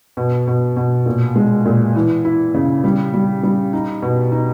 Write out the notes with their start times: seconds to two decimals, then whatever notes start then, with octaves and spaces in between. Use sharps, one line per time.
0.17 B2
0.47 B2
0.77 B2
1.06 A#2
1.36 G#3
1.66 A#2
1.95 E3
2.25 E4
2.54 C#3
2.84 G3
3.14 G3
3.43 G3
3.73 D#4
4.02 B2
4.32 D#4